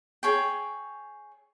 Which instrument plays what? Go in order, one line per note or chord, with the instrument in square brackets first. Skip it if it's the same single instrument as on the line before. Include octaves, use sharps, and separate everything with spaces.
[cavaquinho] G#4 C#5 G5